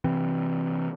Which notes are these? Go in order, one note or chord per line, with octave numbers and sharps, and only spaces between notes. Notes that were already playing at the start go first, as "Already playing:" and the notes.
C3 E3 C4